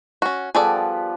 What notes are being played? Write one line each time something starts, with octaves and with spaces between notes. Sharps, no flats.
C#4 F#4
F3 G3 B3 G#4 A4 D5